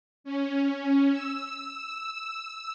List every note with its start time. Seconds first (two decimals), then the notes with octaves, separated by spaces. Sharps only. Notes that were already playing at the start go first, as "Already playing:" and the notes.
0.24 C#4
1.11 E6